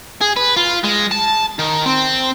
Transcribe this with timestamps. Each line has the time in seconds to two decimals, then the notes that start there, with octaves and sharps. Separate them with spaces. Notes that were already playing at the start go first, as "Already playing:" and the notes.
0.21 G#4
0.37 B4
0.56 F4
0.84 G#3
1.11 A5
1.59 D#3
1.86 C4